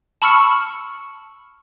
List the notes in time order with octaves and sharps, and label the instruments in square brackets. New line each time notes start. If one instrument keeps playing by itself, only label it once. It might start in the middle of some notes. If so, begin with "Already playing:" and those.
[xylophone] A5 B5 C#6 E6 F6 C#7